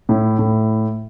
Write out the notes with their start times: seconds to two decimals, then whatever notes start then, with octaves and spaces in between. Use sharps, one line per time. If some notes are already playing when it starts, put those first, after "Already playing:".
0.09 A2 E4
0.39 A2